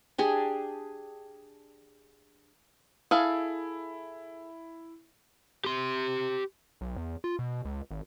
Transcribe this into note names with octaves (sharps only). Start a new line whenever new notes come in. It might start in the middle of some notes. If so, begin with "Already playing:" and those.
D4 G4 G#4
E4 G#4 A4 F5
G4 C6
B1
E2
F4
B2
C#2
G#1